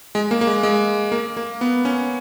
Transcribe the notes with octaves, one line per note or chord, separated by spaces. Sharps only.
G#3
A#3
A#3
G#3
G#3
A#3
A#3
B3
C#4